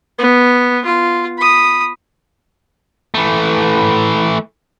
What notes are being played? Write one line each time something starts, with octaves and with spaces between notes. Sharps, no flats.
B3
F4
B5 D#6
E3 A3